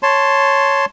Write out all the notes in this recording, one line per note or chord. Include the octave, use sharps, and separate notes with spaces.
C#5 A5 C6